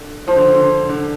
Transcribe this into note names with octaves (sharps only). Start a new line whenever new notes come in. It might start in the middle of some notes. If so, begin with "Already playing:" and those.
Already playing: D3
F3 C5
D3
D3
D3